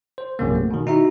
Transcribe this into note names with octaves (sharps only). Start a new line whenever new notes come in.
C5
A#1 F#2 C3 A#3
A3
B2 D#3
D#4 E4 F#4 E5 A#5